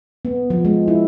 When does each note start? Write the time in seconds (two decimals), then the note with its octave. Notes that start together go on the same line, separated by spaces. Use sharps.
0.25 B3
0.50 F3
0.65 G#3
0.88 E4